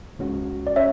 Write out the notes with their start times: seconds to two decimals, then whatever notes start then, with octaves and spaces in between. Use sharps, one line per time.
0.19 C#2 C#3 G#3 C#4 F#4
0.67 D5
0.76 C#4 C#5 E5